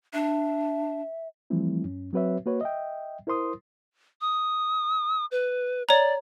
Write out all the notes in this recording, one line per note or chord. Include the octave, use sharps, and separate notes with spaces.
D4 E5
E3 F3 G3 A3 C4 E4
F#2 C#4
F#3 C4 F#4 B4 C#5 E5
A#3 F#4 B4 C#5
D#5 E5 G5
E4 A#4 C5 C6 D#6
D#6
B4
C#5 D5 A#5